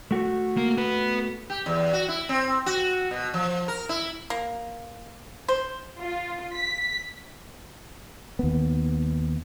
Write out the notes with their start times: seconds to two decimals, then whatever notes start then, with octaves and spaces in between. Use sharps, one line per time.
0.11 A3 F#4
0.57 A#3
0.78 B3 B4
1.50 G4
1.66 E2
1.93 F#4
2.08 E4
2.29 C4
2.66 F#4
3.11 B2
3.34 F3
3.68 A#4
3.89 E4
4.30 A#3
5.48 C5
5.99 F4
6.54 B6
8.39 D#2 B3